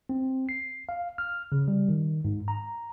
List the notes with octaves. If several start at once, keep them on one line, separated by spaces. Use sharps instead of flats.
C4
C7
F5
F6
C#3
G3
D#3
G#2
A#5